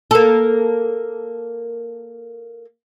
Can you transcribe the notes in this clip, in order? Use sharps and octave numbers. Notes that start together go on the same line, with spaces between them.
A#3 A4